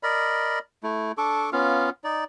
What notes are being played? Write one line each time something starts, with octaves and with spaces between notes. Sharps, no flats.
A#4 D5 D#5 B5
A3 E4
D4 A4 C#6 D6
B3 C#4 F4 F5
D#4 D5